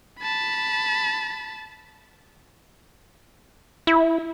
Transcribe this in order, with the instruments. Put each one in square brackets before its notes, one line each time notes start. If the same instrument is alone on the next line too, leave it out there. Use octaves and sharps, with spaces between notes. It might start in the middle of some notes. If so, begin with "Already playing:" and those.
[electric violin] A5 B5
[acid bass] E4